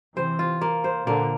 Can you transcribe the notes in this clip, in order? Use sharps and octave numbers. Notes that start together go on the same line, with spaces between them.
C3 E3 C5
F4
A#3
C5
A#2 D3 A#3